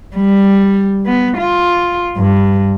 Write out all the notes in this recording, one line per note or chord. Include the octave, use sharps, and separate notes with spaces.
G3
B3
F4
G2